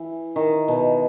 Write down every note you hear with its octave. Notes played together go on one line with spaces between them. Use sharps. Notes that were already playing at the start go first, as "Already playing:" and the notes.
Already playing: E3
D#3
B2